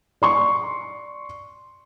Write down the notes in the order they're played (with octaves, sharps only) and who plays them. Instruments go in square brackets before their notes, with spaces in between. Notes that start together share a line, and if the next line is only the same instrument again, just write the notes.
[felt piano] D5 C6 C#6